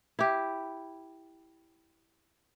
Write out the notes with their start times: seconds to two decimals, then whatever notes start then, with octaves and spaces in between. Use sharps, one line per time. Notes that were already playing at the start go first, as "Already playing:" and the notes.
0.19 E4 G4